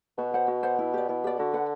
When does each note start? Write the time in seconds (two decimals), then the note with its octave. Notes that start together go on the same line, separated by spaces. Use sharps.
0.18 B2 F#4
0.34 C5 F#5
0.48 F#4
0.63 C5 F#5
0.79 E4
0.94 G4 D5
1.09 B2 E4
1.24 G4 D5
1.39 D3 F#4
1.54 B4 F#5